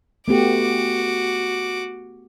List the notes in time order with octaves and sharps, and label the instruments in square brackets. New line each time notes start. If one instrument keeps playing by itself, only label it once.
[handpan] A3 B3 G4 [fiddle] F#4 D6